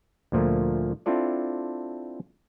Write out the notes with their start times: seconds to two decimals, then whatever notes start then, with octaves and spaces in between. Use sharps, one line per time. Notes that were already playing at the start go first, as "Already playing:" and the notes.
0.32 D2 A#2 F3 A3 A#3
1.06 C4 D4 E4 F4 A4 D5